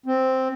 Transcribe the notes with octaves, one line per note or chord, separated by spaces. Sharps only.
C4